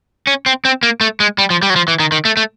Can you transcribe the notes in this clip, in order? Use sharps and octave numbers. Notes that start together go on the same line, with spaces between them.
C#4
C4
C4
A#3
A3
G#3
G3
F3
G3
F#3
F3
E3
D#3
D#3
A3
A3